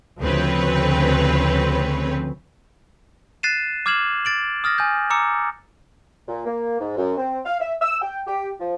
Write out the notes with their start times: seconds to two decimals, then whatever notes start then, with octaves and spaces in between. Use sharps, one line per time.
0.20 D2 C#3 F3 C4 B4 C#5
3.43 F#6 A6 C7 D#7 E7
3.86 D6 F6 G#6 C7 E7 F#7
4.25 A6 D7 F#7
4.64 D#6 F6 A6 A#6
4.78 G#5 G6
5.10 A#5 D6 E6 C#7
6.28 A#2
6.46 A#3
6.80 G#2
6.97 F#2
7.17 C4
7.45 F5
7.60 E5
7.82 E6
8.02 G5
8.27 G4
8.60 F3